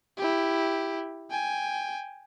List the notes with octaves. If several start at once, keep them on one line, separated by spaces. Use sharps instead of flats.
E4 G4
G5 G#5